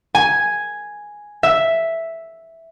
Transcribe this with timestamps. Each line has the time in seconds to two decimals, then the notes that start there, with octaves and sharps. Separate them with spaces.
0.15 G#5
1.43 E5